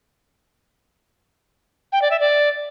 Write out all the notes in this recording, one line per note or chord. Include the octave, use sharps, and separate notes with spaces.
G5
D5
E5
D5